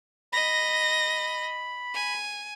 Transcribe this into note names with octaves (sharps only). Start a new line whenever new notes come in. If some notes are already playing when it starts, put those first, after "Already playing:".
D#5 B5 A#6
G#5